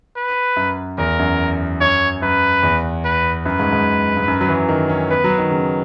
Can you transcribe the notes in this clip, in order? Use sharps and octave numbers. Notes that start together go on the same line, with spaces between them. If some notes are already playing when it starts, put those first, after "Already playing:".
B4
F#2
E2 A#4
F#2
F#2 C#5
F#2 B4
E2
B4
F#2 B4
G#2
G#2
G#2
F#2
F#3
E3
D#3
C#4
B3 B4
F#3
D#3
C#3